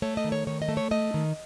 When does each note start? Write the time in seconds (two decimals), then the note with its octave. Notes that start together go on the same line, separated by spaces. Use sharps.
0.02 A3 C#5
0.17 D#5
0.24 D#3
0.32 C#5
0.47 D#3 C#5
0.62 D#5
0.68 A3
0.77 C#5
0.91 A3 D#5
1.14 D#3